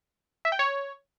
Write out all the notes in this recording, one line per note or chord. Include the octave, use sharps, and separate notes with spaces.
E5
G5
C#5